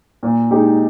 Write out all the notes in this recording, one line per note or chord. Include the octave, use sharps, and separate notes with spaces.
A#2
G#3 D#4 G4